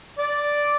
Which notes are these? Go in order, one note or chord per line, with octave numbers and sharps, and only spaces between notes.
D5